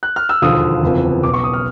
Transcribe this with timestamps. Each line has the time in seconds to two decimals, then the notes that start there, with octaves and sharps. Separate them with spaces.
0.03 F#6
0.16 F6
0.29 E6
0.42 E1 D#2 D3 F3 D#6
0.83 F#1 E2 C3 F3
1.23 B1 B2 D6
1.34 C#6
1.44 D#6
1.53 F6